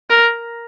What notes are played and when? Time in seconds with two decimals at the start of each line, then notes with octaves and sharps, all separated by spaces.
0.10 A#4